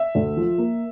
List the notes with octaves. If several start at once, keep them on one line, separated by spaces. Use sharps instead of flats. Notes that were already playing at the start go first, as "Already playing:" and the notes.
Already playing: E5
D2
F3
A#3